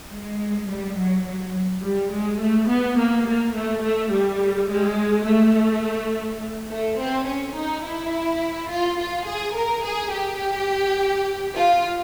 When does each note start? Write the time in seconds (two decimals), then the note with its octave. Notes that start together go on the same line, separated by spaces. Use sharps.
0.12 G#3
0.69 G3
0.98 F#3
1.26 F#3
1.83 G3
2.12 G#3
2.41 A3
2.69 B3
2.98 A#3
3.26 A#3
3.55 A3
3.83 A3
4.12 G3
4.69 G#3
5.26 A3
6.69 A3
6.98 C4
7.27 C#4
7.56 D#4
7.84 E4
8.70 F4
8.98 F4
9.26 G#4
9.55 A#4
9.84 G#4
10.13 G4
11.56 F4